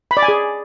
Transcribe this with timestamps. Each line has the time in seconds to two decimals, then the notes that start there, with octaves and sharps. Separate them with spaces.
0.11 B5
0.17 D5
0.23 G#5
0.28 G#4